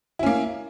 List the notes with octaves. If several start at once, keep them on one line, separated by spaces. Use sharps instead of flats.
A#3 C#4 E4